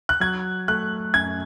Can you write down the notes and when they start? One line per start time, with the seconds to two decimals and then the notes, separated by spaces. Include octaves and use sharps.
0.09 F#6
0.20 F#3 G#6
0.68 A3 F#6
1.14 F#2 G#6